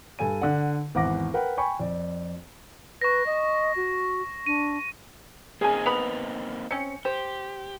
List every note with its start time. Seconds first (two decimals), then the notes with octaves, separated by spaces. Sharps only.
0.19 G2 A4 G#5 D#7
0.42 D3 D5 F#5
0.95 G#1 E2 F#5 D6 A#6
1.34 A#4 B4 F#5 G5
1.57 G5 G#5 B5 C#6
1.80 F2 D5
3.01 B4 C#6 A#6
3.26 D#5
3.76 F#4
4.46 D4 D#7
5.61 A#3 C4 D#4 G#4 G#5
5.86 B3 B5 F7
6.71 C4 C#4 C#7
7.05 G4 C5